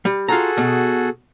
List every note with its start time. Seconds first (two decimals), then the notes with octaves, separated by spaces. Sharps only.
0.05 G3
0.28 F4 F#4 G#4 A4 A#5
0.57 B2